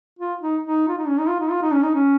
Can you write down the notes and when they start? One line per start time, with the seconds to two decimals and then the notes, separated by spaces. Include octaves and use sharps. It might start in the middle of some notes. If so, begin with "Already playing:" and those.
0.19 F4
0.41 D#4
0.63 D#4
0.88 F4
0.97 D#4
1.07 C#4
1.18 D#4
1.29 F4
1.40 D#4
1.51 F4
1.62 D#4
1.73 C#4
1.83 D#4
1.94 C#4